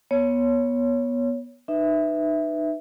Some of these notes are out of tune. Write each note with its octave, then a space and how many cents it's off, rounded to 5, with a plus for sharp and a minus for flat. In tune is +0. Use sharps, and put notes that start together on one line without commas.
B3 -20 C#5 +5
D#4 -30 B4 +15 E5 +0